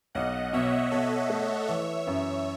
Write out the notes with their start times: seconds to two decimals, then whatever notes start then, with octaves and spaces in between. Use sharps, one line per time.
0.15 B1 D#5 F#5
0.53 B2 C#5 E5
0.91 B2 A4 C#5
1.30 A3
1.68 E3 C#5 E5
2.07 F#2